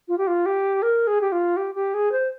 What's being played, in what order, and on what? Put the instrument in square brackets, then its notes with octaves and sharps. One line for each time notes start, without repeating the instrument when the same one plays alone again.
[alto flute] F4
G4
F4
G4
A#4
G#4
G4
F4
G4
G4
G#4
C5